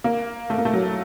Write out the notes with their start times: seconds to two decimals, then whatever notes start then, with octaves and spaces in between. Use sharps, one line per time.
0.04 A#3
0.50 A3
0.58 A#3
0.65 A3
0.73 F#3